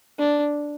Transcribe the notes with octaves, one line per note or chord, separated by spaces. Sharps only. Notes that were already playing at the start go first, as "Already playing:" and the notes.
D4